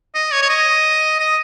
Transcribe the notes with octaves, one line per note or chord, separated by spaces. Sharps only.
D#5
C#5
C#5
D#5
D#5